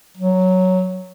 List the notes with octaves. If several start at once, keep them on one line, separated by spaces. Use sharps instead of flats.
F#3